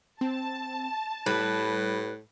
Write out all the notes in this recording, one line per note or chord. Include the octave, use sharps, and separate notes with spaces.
C4 A5
A2 G3 B4